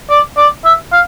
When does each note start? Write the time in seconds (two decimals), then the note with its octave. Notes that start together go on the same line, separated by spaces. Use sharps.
0.10 D5
0.38 D5
0.65 E5
0.92 F5